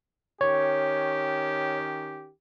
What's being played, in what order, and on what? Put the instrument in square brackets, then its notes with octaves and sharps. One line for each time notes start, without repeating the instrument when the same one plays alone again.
[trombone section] D#3 C#4 G4 [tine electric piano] C#5